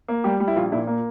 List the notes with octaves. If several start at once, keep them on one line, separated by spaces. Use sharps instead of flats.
A#3
G3 G4
G3
E4
A#1 F4
A#2 E4
A#3